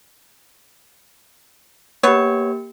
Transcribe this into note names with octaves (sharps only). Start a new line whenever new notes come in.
A#3 B3 G4 C#5